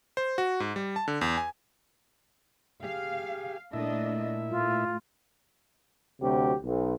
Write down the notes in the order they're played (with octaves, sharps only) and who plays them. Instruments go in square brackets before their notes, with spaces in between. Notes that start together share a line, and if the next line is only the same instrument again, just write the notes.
[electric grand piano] C5
F#4
G#2
G3
A5
D3
E2
G#5
[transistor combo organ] G4 G#4 [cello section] F5
[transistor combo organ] A#2 E4 E5 [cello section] A3 D4 D#5
[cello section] A2 [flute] F4
[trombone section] D2 C3 F#3 G4
B1